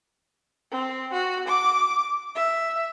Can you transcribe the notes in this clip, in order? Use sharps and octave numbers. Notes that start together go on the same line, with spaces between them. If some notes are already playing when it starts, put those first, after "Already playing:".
C4
F#4
D6
E5